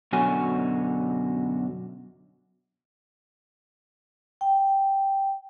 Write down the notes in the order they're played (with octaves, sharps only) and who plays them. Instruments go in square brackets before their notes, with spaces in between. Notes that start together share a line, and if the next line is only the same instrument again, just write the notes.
[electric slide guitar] F#2 B2 D3 F#4 C#5 G#5
[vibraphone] G5